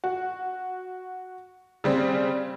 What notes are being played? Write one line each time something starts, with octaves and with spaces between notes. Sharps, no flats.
F#4
C#3 G3 C4